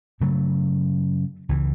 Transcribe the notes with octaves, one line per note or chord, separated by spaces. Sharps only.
F#2 C#3 F#3 A3
C#2 C#3 E3